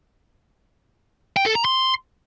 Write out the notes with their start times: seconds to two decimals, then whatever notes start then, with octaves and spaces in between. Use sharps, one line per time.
1.37 G5
1.46 A4
1.55 A#5
1.65 C6